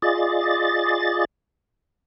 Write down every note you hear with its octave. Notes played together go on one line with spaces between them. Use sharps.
F4 G#4 D5 D#5 A6